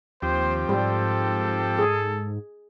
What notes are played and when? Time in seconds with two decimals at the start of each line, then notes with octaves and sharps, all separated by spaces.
0.22 D#2 F3 C4 G4 C5
0.69 G#2 G3 A4
1.79 G#4